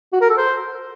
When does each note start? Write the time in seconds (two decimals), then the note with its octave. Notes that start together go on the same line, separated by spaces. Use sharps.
0.13 F#4
0.21 A#4
0.29 A4
0.38 C5